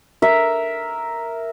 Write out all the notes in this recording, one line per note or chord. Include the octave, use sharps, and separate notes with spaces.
A#4 E5